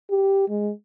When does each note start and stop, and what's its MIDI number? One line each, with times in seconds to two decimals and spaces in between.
0.10 0.47 67
0.49 0.71 56